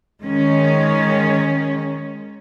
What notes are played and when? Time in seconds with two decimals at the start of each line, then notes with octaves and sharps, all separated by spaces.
0.23 D#3 G#3 C#4